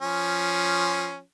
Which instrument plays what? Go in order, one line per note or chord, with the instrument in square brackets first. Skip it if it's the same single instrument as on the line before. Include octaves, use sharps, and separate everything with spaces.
[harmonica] F3 C#4